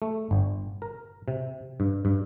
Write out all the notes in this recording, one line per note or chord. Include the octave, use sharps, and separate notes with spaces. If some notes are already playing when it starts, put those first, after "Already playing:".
A3
G1
A#4
C3
G2
G2